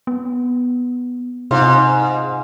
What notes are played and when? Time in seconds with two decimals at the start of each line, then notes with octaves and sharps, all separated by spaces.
0.07 B3
1.51 G#2 C3 F4